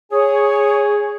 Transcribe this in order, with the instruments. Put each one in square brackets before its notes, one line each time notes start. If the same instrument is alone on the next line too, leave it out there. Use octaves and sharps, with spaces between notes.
[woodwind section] G#4 [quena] C#5